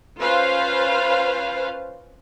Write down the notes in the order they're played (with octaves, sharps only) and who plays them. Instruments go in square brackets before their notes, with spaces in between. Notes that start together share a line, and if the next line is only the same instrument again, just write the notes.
[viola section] C#4 F4 B4 C5 F5